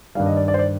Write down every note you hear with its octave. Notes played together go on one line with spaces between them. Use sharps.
G2 D#3 G3 F5
D#5
D5
D5
C5
D5